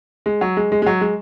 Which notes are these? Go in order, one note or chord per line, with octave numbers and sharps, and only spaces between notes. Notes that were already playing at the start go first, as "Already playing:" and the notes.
G#3
F#3
G#3
G#3
G#3
F#3
G#3